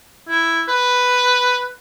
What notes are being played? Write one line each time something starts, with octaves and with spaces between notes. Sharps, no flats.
E4
B4